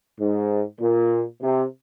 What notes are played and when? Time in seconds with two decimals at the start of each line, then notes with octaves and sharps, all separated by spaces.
0.20 G#2
0.80 A#2
1.41 C3